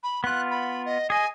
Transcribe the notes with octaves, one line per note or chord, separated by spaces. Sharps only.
B5
B3 F4 F#6
B5
D#5
G#4 D#5 G#5